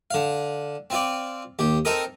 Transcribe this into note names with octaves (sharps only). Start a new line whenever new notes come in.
D3 F5
C4 F4 D5
D#2 G4
C4 D#4 A4 A#4 D#6